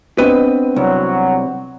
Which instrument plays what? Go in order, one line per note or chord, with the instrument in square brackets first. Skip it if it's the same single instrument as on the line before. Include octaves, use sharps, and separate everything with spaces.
[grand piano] B3 C4 D4 [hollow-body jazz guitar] B4 D#5
[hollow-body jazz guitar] C2 [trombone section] F#3